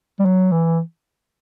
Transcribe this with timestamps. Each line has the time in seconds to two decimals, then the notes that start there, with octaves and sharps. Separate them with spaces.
0.20 G3
0.25 F#3
0.52 E3